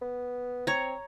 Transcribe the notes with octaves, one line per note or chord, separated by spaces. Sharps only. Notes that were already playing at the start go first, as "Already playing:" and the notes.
B3
C4 C#5 A#5